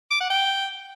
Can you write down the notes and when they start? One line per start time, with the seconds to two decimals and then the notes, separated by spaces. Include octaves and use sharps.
0.11 D6
0.21 F#5
0.30 G5